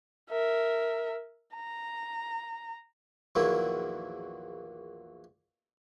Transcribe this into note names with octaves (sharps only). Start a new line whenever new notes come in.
A#4 E5
A#5
A#1 E2 D#3 F#3 A#3 E4